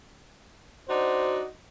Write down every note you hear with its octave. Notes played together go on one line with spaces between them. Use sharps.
D4 D#4 F#4 C5